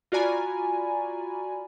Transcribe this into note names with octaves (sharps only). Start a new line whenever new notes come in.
F4 F#4 D5 G#5 A#5 B5